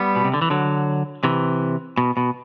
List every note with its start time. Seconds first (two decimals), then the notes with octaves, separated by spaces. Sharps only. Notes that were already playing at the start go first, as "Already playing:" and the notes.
Already playing: G3 B3
0.16 B2
0.25 C3
0.34 D3
0.42 E3
0.50 D3 F#3
1.24 C3 E3
1.98 B2
2.17 B2